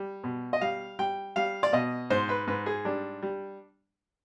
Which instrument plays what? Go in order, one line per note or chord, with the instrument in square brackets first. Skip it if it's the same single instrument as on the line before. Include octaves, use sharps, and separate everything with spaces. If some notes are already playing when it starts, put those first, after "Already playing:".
Already playing: [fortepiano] G3
B2
D#5
G3 F5
G3 G5
G3 F5
D5
B2 D#5
G#2 C5
B4
G#2 B4
G#4
G3 D4
G3